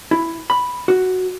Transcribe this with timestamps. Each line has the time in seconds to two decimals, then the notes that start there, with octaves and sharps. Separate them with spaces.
0.11 E4
0.50 B5
0.88 F#4